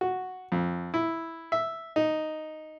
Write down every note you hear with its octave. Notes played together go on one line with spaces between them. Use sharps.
F#4
F2
E4
E5
D#4